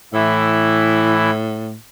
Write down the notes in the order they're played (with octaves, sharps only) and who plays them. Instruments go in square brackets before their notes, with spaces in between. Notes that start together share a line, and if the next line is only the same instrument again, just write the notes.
[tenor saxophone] A2 [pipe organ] E3 E4